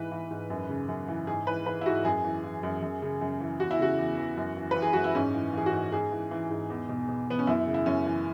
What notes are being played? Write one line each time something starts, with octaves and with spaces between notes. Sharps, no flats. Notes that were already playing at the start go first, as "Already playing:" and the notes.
Already playing: G#2 E3 B4
E3
G#2
F#2
C#3
F#2
E3
G#2 G#4
E3 B4
E3 B4
E4
G#2 F#4
F#2 G#4
E3
E3
F#2
F#2
C#3
F#2
E3
E2 F#4
E4
C#3 F#4
E2
E3
F#2
E3
B4
E3
G#4
F#2 F#4
E4
G#2 C#4
E3
E3 G#4
F#4
G#2
G#2 G#4
E3
E3
G#2
E2
B2
B2
E2 B3
C#4
F#2 E4
C#3
E4
F#2 C#4
E3